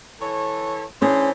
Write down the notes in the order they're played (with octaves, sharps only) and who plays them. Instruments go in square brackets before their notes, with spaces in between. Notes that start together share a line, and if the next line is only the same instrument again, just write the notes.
[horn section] E3 A4 C#5
[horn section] E3 D4 C5 [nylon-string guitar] C#4 G#4